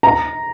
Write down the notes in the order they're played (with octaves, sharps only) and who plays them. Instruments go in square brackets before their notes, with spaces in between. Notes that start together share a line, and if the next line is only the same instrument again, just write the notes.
[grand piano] A#5